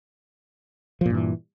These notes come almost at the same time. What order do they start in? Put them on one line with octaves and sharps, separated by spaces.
F3 A#2 G2 E3